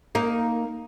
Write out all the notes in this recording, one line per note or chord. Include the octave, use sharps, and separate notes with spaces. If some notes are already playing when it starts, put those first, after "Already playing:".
A#3 D#4